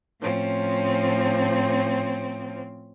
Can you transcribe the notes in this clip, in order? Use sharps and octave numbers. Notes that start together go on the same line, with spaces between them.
A2 F3 C4 C#4